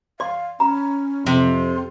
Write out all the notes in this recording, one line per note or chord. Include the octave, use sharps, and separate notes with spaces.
D5 F5 C6
C#4 A#5 B5
F2 C3 C6